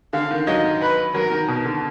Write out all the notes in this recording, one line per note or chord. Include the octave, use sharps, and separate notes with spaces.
D3 F5
D#3
F#3 D#5
B4
F#3 A#4
D#3
B2
D3